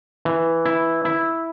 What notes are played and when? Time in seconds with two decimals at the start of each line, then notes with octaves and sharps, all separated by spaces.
0.25 E3
0.65 E4
1.05 E4